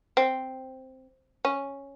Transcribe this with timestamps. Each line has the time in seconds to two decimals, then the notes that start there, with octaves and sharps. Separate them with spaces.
0.17 C4
1.45 C#4